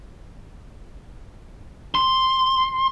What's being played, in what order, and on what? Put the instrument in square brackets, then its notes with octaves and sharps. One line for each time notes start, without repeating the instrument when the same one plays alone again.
[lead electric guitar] C6